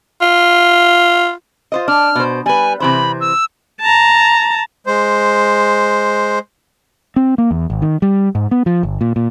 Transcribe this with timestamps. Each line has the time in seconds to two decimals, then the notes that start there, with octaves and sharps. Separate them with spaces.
0.22 F4
1.72 F4 C5 D#5
1.88 D4 F6
2.15 B2 C5
2.46 G3 B4 G#5
2.80 C3 E3 C5 B5
3.21 E6
3.81 A5 A#5
4.87 G#3 C5
7.16 C4
7.38 A#3
7.51 E2
7.70 G#1
7.82 D#3
8.02 G3
8.35 G#2
8.51 B3
8.66 F3
8.83 G1
9.01 A#2
9.16 A#2